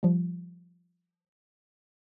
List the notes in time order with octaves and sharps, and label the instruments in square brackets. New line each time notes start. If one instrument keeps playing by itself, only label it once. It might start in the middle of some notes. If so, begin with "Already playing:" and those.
[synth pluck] F3 G3